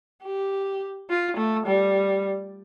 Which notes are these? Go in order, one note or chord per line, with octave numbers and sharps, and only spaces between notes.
G4
F4
A3
G3